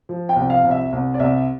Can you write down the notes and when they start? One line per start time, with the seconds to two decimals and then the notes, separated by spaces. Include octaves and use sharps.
0.09 F3
0.29 G5
0.36 C2
0.50 F5
0.64 C2
0.71 E5
0.93 C2
1.14 D5
1.20 C2 E5